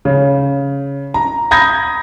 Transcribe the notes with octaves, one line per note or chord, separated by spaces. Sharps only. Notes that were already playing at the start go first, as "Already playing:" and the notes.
C#3
A#5
A#5 B5 D#6 G6 G#6 A#6